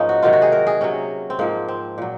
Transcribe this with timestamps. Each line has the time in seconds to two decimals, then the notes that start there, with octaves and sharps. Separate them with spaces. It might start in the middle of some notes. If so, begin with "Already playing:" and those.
Already playing: G#2 F3 A#3 C#4 D#4
0.09 F#4
0.23 C3 D#3 F#3 F4
0.33 F#4
0.42 G#4
0.52 A#4
0.67 G#4
0.81 C3 F#3 C#4
1.30 C4
1.39 G#2 F3 A#3
1.68 C4
1.98 A#2 F#3